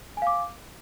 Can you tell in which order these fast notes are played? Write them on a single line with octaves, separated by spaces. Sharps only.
G#5 F5 D6